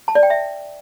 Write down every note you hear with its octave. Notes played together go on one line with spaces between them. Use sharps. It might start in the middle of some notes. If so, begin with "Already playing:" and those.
A5
D5
G5
E5